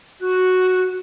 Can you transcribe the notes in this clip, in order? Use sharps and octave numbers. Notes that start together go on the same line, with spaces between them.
F#4 F#6